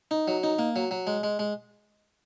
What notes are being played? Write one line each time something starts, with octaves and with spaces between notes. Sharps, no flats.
D#4
F#3
D#4
A#3
F#3
F#3
G#3
G#3
G#3